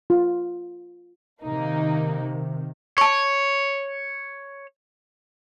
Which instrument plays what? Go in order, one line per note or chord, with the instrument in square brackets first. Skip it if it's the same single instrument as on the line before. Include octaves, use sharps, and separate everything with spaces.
[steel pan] F4
[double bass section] C3 D#3 [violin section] A#3 D#4
[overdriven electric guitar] C#5 [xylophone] A5 C#6